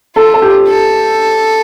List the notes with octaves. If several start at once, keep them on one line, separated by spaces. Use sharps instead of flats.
F4 A4
A4
G4
A4